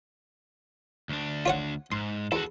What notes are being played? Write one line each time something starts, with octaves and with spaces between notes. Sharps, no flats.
D2 D4
F4 C#5 F#5
G#2 C6
E2 F#4 A4